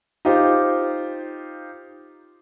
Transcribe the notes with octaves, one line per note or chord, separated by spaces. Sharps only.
D#4 F4 G4 C5